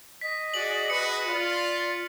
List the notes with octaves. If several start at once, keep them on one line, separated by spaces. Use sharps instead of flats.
D#5 B6
F#4 G#4 D5 F#7
F#4 G#4 B4 C#7
F4 D5